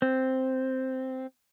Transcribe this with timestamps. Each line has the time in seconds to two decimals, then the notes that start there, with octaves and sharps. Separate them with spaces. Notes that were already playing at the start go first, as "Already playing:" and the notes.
0.02 C4